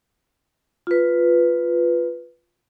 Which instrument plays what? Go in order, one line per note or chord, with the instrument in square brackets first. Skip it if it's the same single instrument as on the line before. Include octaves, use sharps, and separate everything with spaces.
[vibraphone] F4 B4